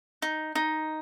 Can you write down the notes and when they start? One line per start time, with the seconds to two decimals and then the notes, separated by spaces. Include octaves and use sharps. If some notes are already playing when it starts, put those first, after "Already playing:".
0.22 D#4
0.55 D#4